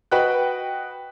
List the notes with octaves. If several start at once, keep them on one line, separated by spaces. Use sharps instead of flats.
F#4 B4 D#5 G5 F#6